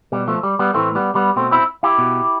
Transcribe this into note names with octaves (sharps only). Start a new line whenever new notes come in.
B2 G3
F3 A3
G3
G3 B3
A2 E3 A3 C4
G3 B3
G3 B3
B2 A3 C4
C4 E4
E4 G4
B2